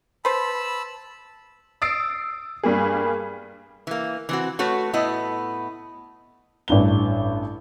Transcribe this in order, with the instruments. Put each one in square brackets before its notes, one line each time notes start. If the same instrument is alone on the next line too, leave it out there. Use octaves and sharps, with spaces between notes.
[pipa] B4 C5 [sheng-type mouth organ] A5 B5 E6
[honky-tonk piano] D#6 E6 A6 C7 D7
G2 G3 A#3 G#4
[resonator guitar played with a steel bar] E3 A#3
E3 C4 F#4
A3 F#4 B4 C#5
A2 B3 E4 D#5
[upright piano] A1 G2 G7